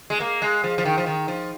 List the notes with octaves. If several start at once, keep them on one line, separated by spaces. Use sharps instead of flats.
G#3
A#3
G#3
F3
F3
D#3
F3
D#3
F3